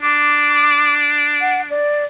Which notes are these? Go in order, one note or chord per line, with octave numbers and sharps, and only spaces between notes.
D4 D6
F#5
D5